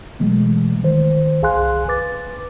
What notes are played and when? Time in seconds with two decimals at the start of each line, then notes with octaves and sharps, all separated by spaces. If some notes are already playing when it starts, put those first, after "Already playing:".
0.20 B2 E3 F#3 G#3 A3
0.83 D#3 C5
1.42 C2 G#4 F5 G#5 C6 F#6
1.88 B4 D6 A6